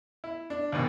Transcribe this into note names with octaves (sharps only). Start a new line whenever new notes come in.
E4
D4
D#2 G#2 B2 D#3